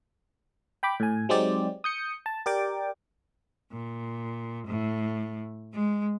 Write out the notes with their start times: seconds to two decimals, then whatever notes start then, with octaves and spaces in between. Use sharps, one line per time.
0.83 G5 B5 D6
1.00 A2 G#5
1.29 F#3 G#3 C4 D#4 G4 D5
1.84 D#6 G6 C#7
2.26 A5
2.46 G4 A#4 D5 G5 D6
3.71 A#2
4.65 A2
5.72 G#3